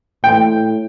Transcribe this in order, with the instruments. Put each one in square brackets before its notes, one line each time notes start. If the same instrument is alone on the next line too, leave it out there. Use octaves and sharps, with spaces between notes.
[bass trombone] A2 [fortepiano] G5